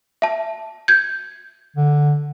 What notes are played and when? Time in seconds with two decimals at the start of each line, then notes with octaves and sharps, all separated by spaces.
0.22 E5 A5
0.88 G6 G#6
1.76 D3